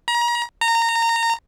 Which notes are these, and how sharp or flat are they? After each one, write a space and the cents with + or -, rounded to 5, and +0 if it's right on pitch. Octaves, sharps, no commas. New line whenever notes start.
A#5 +35
A#5 -20